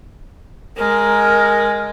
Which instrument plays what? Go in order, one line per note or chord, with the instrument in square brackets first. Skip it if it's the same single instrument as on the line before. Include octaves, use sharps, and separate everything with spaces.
[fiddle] G#3 [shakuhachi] A#4